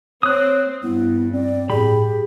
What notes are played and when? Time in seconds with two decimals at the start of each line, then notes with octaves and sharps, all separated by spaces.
0.23 C4 C#5 D#6 F#6
0.83 G2 B3 E4
1.33 C4 D5
1.70 A2 G4 G#4 B5